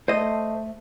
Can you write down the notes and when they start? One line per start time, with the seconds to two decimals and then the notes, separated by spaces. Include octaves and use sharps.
0.08 A3 C5 D#5